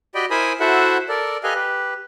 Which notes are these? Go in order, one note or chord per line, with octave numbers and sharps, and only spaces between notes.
F#4 G4 D5 D#5 G5 B5
E4 A#4 C5 G#5 B5 D#6
E4 F#4 A4 C5 E5 F#5
A4 A#4 D5
G4 A4 B4 D#5 F5 G#5
G4 B4